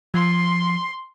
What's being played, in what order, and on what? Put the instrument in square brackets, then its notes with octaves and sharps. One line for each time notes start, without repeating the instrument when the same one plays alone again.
[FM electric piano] F3 [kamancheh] C6